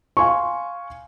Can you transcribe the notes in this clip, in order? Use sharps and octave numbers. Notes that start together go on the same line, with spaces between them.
F5 G#5 C6 C#6